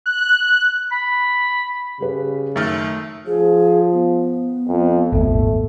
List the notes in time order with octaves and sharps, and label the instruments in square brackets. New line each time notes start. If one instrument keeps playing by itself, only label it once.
[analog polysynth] F#6
[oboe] B5
[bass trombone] C#3 [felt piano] G3 B4
[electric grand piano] F#2 D#3 [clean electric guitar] A3 [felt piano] F6 A6
[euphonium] F3 [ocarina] G#4
[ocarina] B3
[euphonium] F2
[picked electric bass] D#1 G#1 [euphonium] A3